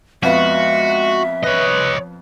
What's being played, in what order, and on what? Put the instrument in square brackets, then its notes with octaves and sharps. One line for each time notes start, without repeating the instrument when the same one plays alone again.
[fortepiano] F2 B3 F5 [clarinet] G#3 [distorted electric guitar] F#4 [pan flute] E5
[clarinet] B4 [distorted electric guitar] C#5 D#5